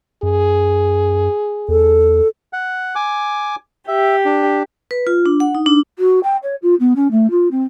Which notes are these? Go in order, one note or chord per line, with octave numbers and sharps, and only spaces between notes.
F#2 G#4
E2 A4
F#5
G#5 D6
G4 E5
D4
B4
F4
D4
F#5
D#4
D4
F#4
G5
C#5
F4
B3
C#4
A3
F4
C4